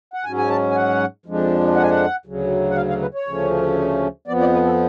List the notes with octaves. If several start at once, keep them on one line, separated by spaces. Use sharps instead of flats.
F#5
G#2 F#3 C#4 G#5
G#5
A5
G#5
F#5
F2 F3 G#3 D4
F#5
G#5
F#5
D2 C#3 F#3
F#5
F5
F5
B4
C#5
D2 C#3 F3 A3 C#4
F2 F3 B3 D5
D5
B4
A4